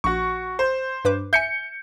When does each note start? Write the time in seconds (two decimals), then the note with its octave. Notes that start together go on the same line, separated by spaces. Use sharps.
0.04 A#1 F#4 C#6
0.59 C5
1.05 G2 B4 D6
1.33 E5 G#5 G6 C#7